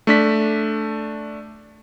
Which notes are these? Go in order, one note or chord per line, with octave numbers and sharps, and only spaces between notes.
A3 D4 B6